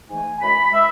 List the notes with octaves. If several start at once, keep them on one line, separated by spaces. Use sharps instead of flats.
G#2 E3 A3 G#5
F#2 E3 G#3 B5
E3 G#3 E5